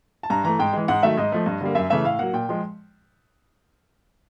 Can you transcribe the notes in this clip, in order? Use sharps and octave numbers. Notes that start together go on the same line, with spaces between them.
A5
G2 A#5
E3 A3 A#5
G#2 G5
E3 G#3
G#2 F#5
D#3 F#3 A3 E5
G#2 D#5
F3 A3
G2
D3 G3 A#3
F#2 E5
C#3 E3 A3 E5
A2 F5
F#3 A#3 F#5
A#2 G5
F3 G#3